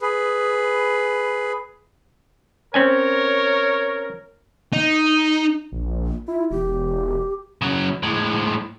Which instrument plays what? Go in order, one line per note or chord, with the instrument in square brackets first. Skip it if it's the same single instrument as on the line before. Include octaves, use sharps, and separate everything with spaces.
[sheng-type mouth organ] G#4 B4
[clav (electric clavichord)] C4 C#4 G#5 [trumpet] A#4 [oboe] C#5
[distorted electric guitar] D#4
[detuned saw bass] A#1
[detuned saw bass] E4 [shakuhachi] F4
[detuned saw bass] E1 [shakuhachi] G4
[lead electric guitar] C#3 F#3
A2 G#3